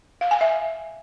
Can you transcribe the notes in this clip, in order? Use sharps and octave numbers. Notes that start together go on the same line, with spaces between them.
F5
G#5
E5